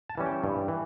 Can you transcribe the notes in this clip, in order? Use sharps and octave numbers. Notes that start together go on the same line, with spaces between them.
A5
E3 G3 C#4
G5
G2
E3